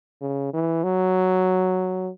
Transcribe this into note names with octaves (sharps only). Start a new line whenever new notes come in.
C#3
E3
F#3